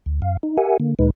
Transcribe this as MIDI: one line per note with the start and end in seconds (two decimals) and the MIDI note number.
0.06 0.20 38
0.22 0.37 42
0.22 0.37 77
0.43 0.57 63
0.57 0.77 67
0.57 0.77 70
0.57 0.77 76
0.57 0.77 78
0.57 0.77 80
0.80 0.95 50
0.80 0.95 58
0.99 1.10 38
0.99 1.10 46
0.99 1.10 56
0.99 1.10 63
0.99 1.10 71